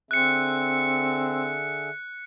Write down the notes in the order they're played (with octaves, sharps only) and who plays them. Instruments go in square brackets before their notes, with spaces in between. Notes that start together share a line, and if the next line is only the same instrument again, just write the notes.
[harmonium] D3 G#4 E5 [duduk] C4 [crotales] F#6 C#7